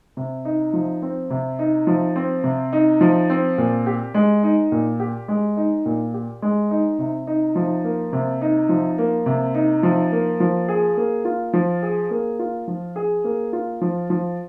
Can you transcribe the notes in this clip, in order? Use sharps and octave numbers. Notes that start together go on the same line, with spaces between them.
C3
D#4
F3
C4
C3
D#4
F3
C4
C3
D#4
F3
C4
A#2
G4
G#3
D#4
A#2
G4
G#3
D#4
A#2
G4
G#3
D#4
C3
D#4
F3
A#3
C3
D#4
F3
A#3
C3
D#4
F3
A#3
F3
G#4
A#3
F4
F3
G#4
A#3
F4
F3
G#4
A#3
F4
F3
F3